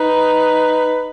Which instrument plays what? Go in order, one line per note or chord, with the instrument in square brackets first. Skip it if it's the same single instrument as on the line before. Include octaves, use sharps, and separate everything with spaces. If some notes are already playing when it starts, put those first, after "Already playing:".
Already playing: [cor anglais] D#4 [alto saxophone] B4